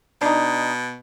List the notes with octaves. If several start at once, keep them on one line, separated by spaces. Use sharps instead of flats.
B2 D4 D#4